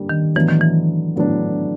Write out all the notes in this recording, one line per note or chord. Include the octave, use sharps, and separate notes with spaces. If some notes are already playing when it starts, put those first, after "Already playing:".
Already playing: D3 G3 A#3 D4
D#3
A2 E3 F#3 B3 D4
D#3
E3
A2 F#3 B3 D4